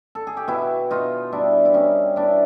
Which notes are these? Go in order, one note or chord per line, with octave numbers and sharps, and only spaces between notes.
A4
G#4
G4
B2 E4 F#4
B2 D#4 F4
G3 D4 E4
E4
G3 C#4 D#4
B2 D4 E4